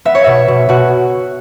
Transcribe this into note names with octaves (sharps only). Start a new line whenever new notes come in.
B3 E5
C#5
B2 E5
B2
B2 F#4